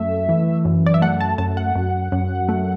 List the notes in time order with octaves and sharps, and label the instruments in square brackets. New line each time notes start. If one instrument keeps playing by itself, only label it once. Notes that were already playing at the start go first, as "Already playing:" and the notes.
Already playing: [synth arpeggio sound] F#2 A3 E5
E3
F#2
D5
E5
A3 F#5
A5
F#2 A5
F#5
F#2
F#2
A3